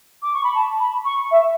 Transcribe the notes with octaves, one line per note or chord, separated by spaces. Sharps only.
D6
C#6
B5
A5
B5
C#6
E5